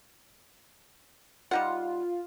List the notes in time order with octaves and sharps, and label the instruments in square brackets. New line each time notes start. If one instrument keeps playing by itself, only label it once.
[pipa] G3 D#4 F#5 [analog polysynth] F4